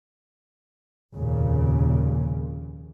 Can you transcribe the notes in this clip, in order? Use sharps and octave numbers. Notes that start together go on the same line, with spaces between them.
F1 D#2 A#2 C#3